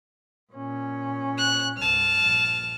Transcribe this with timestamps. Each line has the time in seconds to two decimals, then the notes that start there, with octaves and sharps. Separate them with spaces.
0.52 A#2 C#4
1.38 F#6
1.78 C2 G2 A5 F6
2.19 A#1